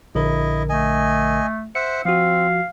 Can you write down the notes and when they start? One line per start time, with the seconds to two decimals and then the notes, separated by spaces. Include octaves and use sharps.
0.15 A#1 D3 E4 A#4 D#5
0.69 A3 D#5 G#5
1.75 C5 E5 F#5 C#7
2.05 F3 C4 F#4 F5